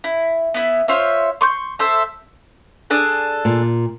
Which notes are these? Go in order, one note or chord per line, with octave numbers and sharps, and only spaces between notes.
E4
B3 E4
F4 C5 C#5 E5
C6 C#6 G6
A4 C5 E5
D4 G#4 A4
A#2